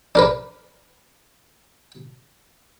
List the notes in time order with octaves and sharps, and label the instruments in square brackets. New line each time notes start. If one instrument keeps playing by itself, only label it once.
[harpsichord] D4 A#4 B4